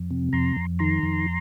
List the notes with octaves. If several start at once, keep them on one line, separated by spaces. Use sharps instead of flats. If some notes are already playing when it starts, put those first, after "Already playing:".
Already playing: F2
C3
F2 A#5 C6
F2
D#3 A#5 C6
F2